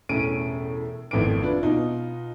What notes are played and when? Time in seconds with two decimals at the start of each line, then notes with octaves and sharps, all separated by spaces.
0.09 E1 A2 C#4 D7 D#7
1.11 G#1 F2 A2 B3 D6 D7
1.43 D4 F4 B4
1.63 B2 D#4 F4